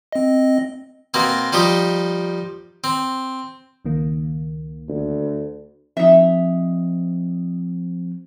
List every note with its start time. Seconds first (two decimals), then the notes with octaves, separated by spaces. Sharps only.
0.12 C4 D#5
1.14 B2 A#3 C4
1.53 F3 G3 D#4 G4
2.84 C4
3.85 C#2 D#3 A#3
4.88 D2
5.97 F3 C4 D#4 E5